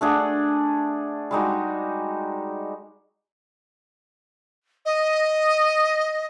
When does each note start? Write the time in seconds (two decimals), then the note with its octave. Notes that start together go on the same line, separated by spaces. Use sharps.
0.01 A3 D4 G#4 F#5
1.31 G3 G#3 D#4 F#4
4.86 D#5